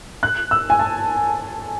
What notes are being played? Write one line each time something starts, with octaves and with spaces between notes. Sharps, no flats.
F#6
E6
G#5
A5